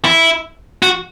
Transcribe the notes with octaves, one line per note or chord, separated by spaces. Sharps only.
E4
F#4